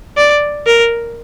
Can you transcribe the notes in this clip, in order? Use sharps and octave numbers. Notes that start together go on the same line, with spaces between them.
D5
A#4